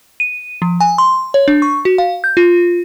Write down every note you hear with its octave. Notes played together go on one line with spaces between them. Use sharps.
D#7
F3
G#5
C6
C#5
D4
C#6
F#4
F5
G6
F4